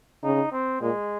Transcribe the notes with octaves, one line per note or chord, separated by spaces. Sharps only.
C#3 D#4
C4
A#2 G#3